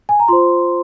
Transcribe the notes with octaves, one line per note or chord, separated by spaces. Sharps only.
G#5
A#5
F4 C5 C6